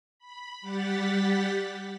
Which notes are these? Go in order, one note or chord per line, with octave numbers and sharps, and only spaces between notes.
B5
G3 G4 F#5 A6 B6